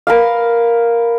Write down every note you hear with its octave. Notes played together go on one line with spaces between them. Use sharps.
A#4 B4 F5